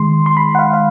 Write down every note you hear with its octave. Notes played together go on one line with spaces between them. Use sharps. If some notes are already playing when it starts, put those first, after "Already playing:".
Already playing: D#3 G#3 C6
C6
B5
F#5
F5
F5